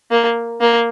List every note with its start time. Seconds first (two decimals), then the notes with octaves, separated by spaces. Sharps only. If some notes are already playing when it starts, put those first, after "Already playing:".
0.11 A#3
0.61 A#3